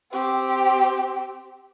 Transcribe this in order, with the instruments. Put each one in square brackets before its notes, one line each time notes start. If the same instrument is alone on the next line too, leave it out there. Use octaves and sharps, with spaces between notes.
[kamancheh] C4 G4